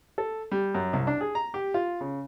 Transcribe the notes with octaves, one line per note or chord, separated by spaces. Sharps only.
A4
G3
F#2
C2
D4
G#4
A#5
G4
F4
C#3